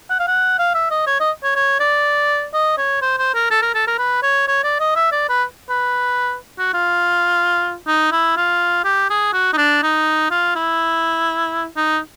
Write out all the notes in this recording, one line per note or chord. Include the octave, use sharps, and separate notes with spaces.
F#5
F5
F#5
F5
E5
D#5
C#5
D#5
C#5
C#5
D5
D#5
C#5
C5
C5
A#4
A4
A#4
A4
A#4
B4
C#5
C#5
D5
D#5
E5
D5
B4
B4
F#4
F4
D#4
E4
F4
G4
G#4
F#4
D#4
D4
D#4
F4
E4
D#4